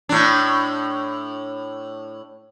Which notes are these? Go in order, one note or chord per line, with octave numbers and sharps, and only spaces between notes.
A2 D4